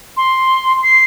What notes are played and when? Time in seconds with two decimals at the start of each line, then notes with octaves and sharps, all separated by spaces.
0.17 C6
0.83 C7